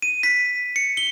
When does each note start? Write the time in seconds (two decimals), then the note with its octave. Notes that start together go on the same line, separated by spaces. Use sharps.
0.02 D#7
0.23 B6
0.76 C#7
0.97 G7